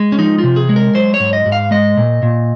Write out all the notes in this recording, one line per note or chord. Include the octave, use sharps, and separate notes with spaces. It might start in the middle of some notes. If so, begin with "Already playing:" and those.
Already playing: G#3
C#4
F3 D#4
F4
C3
G#4
G#3
A#4
F#3 C5
C#5
G#2
D#5
G#2
F5
G#3 D#5
A#2
A#2